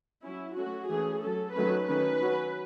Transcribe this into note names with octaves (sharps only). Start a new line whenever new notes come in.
F#3 C#4 E4
F#3 A3 C#4 F#4
E3 A3 C#4 G#4
F#3 C#4 A4
D#3 F#3 A3 C#4 B4
D#3 A3 C#4 B4
F#3 C#4